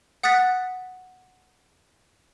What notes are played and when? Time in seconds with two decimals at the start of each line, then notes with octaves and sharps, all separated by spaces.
0.23 F#5 D#6 F#6 A6 B6